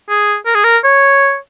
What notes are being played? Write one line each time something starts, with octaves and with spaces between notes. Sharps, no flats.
G#4
A#4
G#4
A#4
C#5